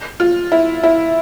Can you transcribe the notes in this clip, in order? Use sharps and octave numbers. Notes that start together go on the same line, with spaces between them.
F4
E4
E4